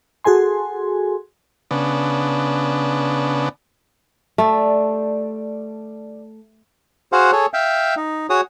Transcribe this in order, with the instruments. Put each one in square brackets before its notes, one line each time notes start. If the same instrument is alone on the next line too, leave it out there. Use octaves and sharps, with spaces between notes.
[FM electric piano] F#4 G#4 A4 G#5 C6
[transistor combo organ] C#3 B3 D4
[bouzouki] D3 G3 D4 [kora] A3
[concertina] F#4 G#4 C5 F5 F#5
G#4 A4 C#5
E5 F5 G5
D#4
F#4 G#4 C#5 D#6